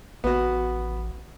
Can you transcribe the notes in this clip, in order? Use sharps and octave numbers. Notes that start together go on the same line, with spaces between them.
A1 B3 F#4